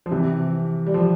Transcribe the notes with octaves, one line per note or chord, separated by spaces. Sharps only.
F3
C3 E3
G3
F3